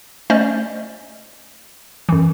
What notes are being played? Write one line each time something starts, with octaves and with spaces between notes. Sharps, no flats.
A3 C#4 C5 D5 D#5
F#2 E3